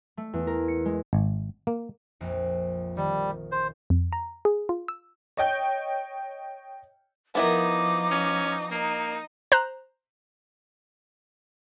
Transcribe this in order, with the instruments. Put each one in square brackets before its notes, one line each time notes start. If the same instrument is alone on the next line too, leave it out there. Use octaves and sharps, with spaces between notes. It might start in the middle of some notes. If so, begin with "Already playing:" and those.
[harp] A3
E2
A#4
C#7
G#3
[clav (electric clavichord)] G#1
A#3
[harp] A#1 F2
[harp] D#3 [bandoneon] G3
[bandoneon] C5
[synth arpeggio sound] F2
A#5
G#4
F4
E6
[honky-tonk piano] C#5 D#5 G5 G6
[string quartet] F3 D#4 [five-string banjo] B3 E4 A#4 [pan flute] D6
[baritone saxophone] C#4
[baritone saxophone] A#3 [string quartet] D#4
[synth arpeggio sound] C5 A#5 F#6